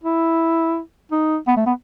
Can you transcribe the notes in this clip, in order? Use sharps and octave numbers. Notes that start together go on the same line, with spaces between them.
E4
D#4
B3
A3
B3